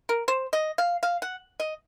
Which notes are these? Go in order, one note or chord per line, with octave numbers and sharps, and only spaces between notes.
A#4
C5
D#5
F5
F5
F#5
D#5